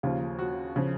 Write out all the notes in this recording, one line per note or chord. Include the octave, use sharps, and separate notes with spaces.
D#2 C#3 F3 F4
F#4
C#3 F3